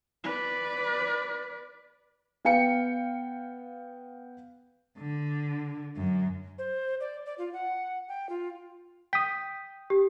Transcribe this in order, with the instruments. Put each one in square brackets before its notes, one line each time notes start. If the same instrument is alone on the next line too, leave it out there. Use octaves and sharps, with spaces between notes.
[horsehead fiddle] B4 D5
[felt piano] B3 F5 G5 C#7
[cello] D3
F#2
[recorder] C5
D5
D5
F4
F#5
G5
F4
[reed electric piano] G5 D#6 [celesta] B6
[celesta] G4